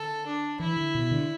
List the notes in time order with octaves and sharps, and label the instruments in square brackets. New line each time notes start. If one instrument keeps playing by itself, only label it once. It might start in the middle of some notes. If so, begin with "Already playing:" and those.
Already playing: [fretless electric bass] D3 [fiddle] A4
[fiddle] D4
[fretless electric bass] E3 [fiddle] E4
[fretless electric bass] D3
B2
D3